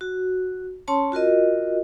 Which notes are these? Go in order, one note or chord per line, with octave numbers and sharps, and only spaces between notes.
F#4
C#4 C#5 A5 C6
F4 F#4 A#4 D#5